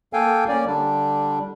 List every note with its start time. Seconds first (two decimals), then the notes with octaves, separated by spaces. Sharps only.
0.13 A#3 A4 F5 G5 G#5
0.48 A#3 C#4 D5
0.66 D3 G3 D4